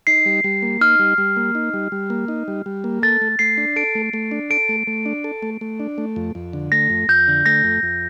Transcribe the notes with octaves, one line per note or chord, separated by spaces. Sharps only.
D#4 C7
G3
G3
A#3
D#4 F6
G3
G3
A#3
D#4
G3
G3
A#3
D#4
G3
G3
A#3
A4 A6
A3
A3 C7
D4
A4 D7
A3
A3
D4
A4 D7
A3
A3
D4
A4
A3
A3
D4
A3
F2
F2
D3
A3 A#6
F2
F2 G6
D3
A3 A#6
F2
F2